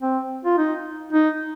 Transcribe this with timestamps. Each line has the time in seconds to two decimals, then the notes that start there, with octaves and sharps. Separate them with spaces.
0.02 C4
0.45 F4
0.58 D#4
1.13 D#4